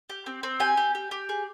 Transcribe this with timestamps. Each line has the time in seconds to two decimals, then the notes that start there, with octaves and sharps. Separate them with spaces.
0.10 G4
0.26 C4
0.43 C4
0.60 G4 G#5
0.77 G4
0.95 G4
1.11 G4
1.29 G#4